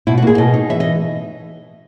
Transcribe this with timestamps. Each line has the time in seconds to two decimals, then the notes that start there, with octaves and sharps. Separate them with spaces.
0.07 B2 E4
0.18 F#4
0.22 A#3 G#4
0.38 B2 D#5
0.54 D#4
0.70 E3 E5
0.80 D#5